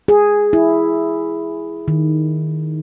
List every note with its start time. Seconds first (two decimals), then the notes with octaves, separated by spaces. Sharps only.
0.08 G#4
0.53 E4
1.88 D#3